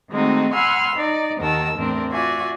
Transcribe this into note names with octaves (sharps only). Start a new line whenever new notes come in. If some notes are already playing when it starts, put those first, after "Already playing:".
D#3 G#3 A3 C4 D#4 F#4
F#5 G#5 B5 C6 E6 F6
D#4 D5
D#2 D#3 A#4 F#5 A5 E6
E2 A2 C4 D4 A#4
F4 F#4 D5 E5 G#5